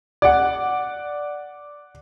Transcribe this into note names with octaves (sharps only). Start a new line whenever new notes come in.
D5 F#5